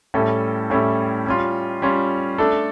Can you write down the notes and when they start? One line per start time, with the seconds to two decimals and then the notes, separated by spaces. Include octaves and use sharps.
0.14 A2 G3 C#4 E4 A4
0.70 A2 G3 C#4 E4 A4
1.26 G3 C#4 F4
1.82 G3 C#4 F4
2.38 A3 D4 A4